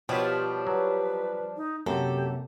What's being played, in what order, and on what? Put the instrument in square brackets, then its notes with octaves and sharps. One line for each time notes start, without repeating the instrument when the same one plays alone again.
[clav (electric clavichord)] B2 [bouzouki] F3 G3 D4 [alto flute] F4 [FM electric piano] G4 C#5 B5
[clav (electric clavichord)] F#3 [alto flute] B4
[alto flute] D#4
[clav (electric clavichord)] F#2 [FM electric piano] C3 A#3 [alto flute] G4 [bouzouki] A4